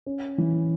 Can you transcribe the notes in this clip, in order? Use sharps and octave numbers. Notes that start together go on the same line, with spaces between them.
C#4
E3